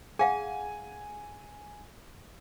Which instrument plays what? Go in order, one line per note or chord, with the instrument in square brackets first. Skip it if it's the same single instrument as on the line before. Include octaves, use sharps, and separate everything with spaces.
[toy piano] G#4 F5 F#5 [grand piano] G#5